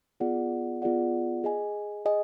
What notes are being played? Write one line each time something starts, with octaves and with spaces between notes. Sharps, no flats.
B3 F4 G#4 D5 F#5
B3 F4 G#4 D5 F#5
G#4 D#5 G#5
G#4 D#5 G#5